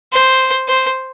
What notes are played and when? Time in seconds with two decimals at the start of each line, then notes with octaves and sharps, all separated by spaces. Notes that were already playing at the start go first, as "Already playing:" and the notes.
0.13 C5
0.68 C5